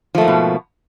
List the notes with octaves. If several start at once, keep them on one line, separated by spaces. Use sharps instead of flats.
G#2 B2 F3 A3 A#3